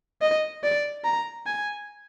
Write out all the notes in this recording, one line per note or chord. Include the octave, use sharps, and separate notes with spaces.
D#5
D5
A#5
G#5